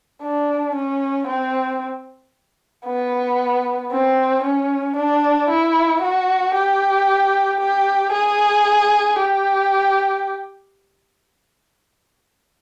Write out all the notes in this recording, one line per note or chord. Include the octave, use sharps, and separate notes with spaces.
D4
C#4
C4
B3
C4
C#4
D4
E4
F#4
G4
G4
G#4
G4